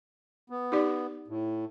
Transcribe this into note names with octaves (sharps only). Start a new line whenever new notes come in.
B3
D#4 G4 D5
A2